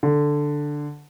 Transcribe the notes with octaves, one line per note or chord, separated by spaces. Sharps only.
D3